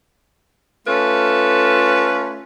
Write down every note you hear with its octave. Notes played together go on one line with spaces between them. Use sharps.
A3 C#4 F4 A4 B4